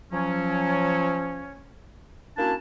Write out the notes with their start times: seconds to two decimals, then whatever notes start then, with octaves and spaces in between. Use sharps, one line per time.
0.12 F3 F#3 C#4
2.37 A#3 C#4 D4 E4 F#4 A5